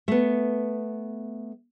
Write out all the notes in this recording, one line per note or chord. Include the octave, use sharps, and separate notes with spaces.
A3 B3